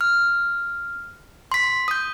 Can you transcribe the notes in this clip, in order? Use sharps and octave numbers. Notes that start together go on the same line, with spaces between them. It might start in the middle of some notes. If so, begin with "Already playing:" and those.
F6
C6 B6
D#6 G6